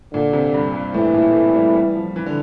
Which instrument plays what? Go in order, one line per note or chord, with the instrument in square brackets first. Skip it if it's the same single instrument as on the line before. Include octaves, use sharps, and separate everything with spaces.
[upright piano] A#2 [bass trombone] D3
[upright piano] C3
G2
G2
[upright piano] A2 [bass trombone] E3
[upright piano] A#2
A3
G3
G3
F3
E3
D3